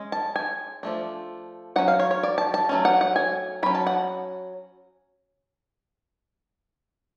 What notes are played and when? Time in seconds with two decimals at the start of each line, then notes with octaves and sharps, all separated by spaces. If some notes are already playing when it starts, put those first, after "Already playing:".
Already playing: G#3 C#4
0.12 A5
0.36 G#5
0.83 F3 A3 D4
1.76 F#3 C#4 F#5
1.88 F5
1.99 C#5
2.11 C#5
2.23 D5
2.38 A5
2.54 A5
2.69 F#3 A3 C#4
2.85 F#5
3.01 F#5
3.16 G#5
3.63 F#3 C#4 B5
3.75 A5
3.87 F#5